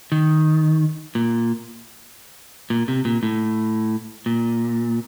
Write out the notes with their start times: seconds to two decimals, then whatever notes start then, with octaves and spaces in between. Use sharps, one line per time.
0.12 D#3
1.15 A#2
2.70 A#2
2.88 C3
3.05 A#2
3.23 A2
4.26 A#2